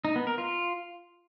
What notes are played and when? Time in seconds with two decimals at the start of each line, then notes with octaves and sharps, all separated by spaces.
0.05 D#4
0.16 B3
0.27 A#4
0.38 F4